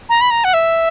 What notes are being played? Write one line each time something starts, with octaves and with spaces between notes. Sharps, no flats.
A#5
B5
A#5
F#5
E5